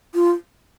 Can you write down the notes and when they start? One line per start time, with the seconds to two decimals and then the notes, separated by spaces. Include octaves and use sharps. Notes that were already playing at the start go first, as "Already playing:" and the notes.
0.15 F4